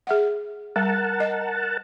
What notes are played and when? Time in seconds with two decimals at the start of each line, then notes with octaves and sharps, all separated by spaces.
0.07 G#4 E5 F#5
0.76 G3 A#4 F#5 A5
1.20 D#5